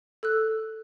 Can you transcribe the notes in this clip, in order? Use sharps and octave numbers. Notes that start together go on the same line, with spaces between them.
A4 E6 F#6